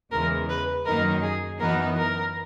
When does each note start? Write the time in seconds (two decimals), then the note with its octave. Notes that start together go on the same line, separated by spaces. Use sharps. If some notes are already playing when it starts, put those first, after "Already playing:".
0.12 E2 C#3 E3 G#3 A#4
0.49 B4
0.86 F#2 D#3 F#3 A#3 D#4 A#4
1.22 G#4
1.59 F#2 E3 B3 D#4 A#4
1.97 A#4